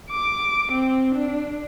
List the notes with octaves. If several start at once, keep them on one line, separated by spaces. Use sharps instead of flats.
D6
C4
D4